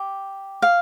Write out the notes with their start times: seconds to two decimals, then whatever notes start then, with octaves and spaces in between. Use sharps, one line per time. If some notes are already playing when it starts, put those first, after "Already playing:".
Already playing: G4
0.62 F5